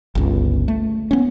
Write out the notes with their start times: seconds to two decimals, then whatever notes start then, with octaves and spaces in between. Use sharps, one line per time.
0.15 G1 C#2
0.68 A3
1.11 B3 C#4